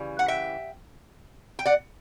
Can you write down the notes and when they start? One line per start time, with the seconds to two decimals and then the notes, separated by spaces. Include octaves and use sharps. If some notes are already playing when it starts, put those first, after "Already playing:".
Already playing: C#3 E3 G3
0.19 F#5
0.28 E5 G5
1.59 G5
1.66 D5 F#5